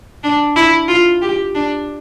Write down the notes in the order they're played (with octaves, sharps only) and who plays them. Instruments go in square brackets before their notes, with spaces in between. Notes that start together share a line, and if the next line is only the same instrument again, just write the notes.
[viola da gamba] D4
E4
F4
G4
D4